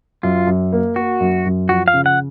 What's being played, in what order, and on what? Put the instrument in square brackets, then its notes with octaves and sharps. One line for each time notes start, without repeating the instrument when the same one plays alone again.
[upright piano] F#2 [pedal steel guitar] F4
[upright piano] F#2
A#3
[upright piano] A#3 [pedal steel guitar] F#4
[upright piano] F#2
F#2
[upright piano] F3 [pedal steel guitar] F#4
[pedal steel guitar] F5
[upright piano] C#3
[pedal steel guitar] F#5